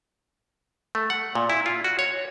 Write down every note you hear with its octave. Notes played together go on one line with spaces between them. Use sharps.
A3
F#5
A#2
E4
F4
F#4
C#5